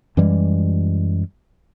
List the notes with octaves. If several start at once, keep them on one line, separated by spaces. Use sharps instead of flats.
F#2 E3 G3 G#3